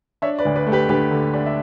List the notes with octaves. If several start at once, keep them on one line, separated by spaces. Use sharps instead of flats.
D4 C#5 E5
B4 D5
D2
B4 D5
A3
G4 B4
D2 G4 B4
D3
D4
E5